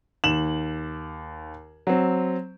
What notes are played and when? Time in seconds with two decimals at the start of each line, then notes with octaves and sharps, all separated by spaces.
0.24 D#2 E7 F#7
1.87 F#3 C4